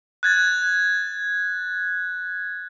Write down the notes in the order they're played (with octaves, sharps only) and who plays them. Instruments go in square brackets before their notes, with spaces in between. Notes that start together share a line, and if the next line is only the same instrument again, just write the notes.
[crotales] F#6 G#6 A6